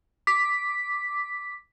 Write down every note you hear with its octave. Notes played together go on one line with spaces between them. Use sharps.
D6 B6